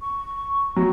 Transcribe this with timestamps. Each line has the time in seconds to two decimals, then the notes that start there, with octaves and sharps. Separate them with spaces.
0.01 C#6
0.76 F#3 A#5